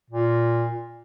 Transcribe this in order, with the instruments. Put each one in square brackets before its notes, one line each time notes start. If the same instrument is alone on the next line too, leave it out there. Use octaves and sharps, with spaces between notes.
[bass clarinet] A#2